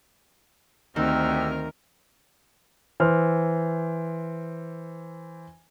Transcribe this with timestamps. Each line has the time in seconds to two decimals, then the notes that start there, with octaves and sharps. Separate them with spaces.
0.96 D2 D#3 C4 G4 A#4 F#5 E6 F6
3.00 E3 C5 F6